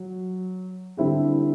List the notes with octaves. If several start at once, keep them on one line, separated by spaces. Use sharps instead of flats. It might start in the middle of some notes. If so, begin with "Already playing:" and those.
Already playing: F#3
D3 G3 C4 E4 G4